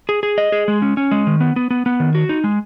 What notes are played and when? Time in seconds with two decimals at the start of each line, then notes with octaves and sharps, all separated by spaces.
0.09 G#4
0.23 G#4
0.38 D#5
0.52 G#4
0.68 G#3
0.82 C#4
0.97 C#4
1.11 G#3
1.27 D#3
1.41 B3
1.56 B3
1.71 B3
1.86 B3
2.00 D#3
2.15 F#4
2.29 D#4
2.44 G#3